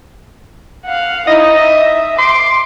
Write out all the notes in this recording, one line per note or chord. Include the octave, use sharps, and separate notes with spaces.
F5 F#5
D#4 E4 D#5
E5
C6 D6